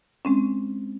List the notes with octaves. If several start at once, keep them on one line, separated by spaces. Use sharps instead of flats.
G#3 C4 C#4